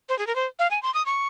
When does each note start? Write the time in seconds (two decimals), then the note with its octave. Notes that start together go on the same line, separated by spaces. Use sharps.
0.09 C5
0.19 G#4
0.27 A#4
0.36 C5
0.59 F5
0.71 G#5
0.83 C6
0.94 D#6
1.06 C#6